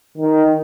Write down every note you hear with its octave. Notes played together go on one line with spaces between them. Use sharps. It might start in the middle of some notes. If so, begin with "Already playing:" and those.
D#3